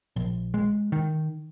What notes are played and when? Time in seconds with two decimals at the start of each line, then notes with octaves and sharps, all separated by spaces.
0.16 A#1
0.54 G#3
0.92 D#3